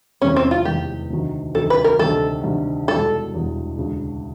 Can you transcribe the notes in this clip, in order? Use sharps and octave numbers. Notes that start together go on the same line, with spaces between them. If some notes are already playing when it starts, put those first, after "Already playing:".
F1 E2 C3 D#3 G3 C#4
C4
F4
F1 E2 C3 D#3 G3 G4
D2 C3 D#3 F#3
D2 C3 D#3 F#3 A4
B4
A#4
D2 C3 D#3 G3 A4
D2 C3 D#3 G3
E1 E2 B2 G3 A4
E1 E2 B2 G3
E1 D2 C#3